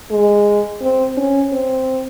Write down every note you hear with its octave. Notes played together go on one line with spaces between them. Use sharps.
G#3
C4
C#4
C4